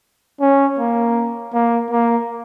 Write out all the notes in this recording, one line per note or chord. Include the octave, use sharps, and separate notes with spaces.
C#4
A#3
A#3
A#3